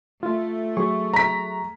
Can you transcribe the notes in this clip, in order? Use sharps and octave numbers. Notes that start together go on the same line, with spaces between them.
A3 F4
F#3 G#4 C#6
A#5 B6